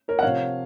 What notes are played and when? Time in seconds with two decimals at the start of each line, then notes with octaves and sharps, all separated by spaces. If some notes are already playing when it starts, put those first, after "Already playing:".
0.08 A#4 C#5
0.19 F#5
0.22 C3 F3 C#5 F5